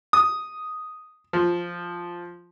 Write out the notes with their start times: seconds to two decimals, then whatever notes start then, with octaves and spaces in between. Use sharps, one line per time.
0.13 D#6
1.33 F3